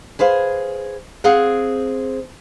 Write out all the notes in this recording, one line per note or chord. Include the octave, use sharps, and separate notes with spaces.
G#4 B4 C5 F5
C4 G#4 F5 F#5